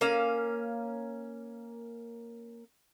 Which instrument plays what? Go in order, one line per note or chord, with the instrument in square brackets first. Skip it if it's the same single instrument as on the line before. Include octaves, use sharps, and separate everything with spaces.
[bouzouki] A#3 C#4 F5